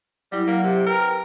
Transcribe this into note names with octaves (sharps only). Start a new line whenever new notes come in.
F#3 G3 E4
F#3 A#3 F#5
C3 G4
A#4 B4 G5 A#5